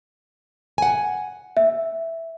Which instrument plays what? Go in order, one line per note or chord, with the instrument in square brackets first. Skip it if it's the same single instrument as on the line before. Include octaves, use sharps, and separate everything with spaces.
[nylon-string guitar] F#5 G#5
[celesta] E5